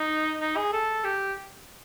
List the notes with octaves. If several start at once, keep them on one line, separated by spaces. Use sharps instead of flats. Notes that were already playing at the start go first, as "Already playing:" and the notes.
Already playing: D#4
D#4
G#4
A4
G4